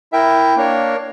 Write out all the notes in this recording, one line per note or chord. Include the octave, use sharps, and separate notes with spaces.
E4 A#4 E5 G5
A#3 D4 A#4 C#5